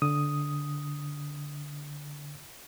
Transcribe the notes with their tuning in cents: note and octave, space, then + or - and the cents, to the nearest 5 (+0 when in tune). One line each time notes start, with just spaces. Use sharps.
D3 -10 D#6 +0